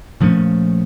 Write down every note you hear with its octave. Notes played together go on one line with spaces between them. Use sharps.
A#2 F3 A3 C#4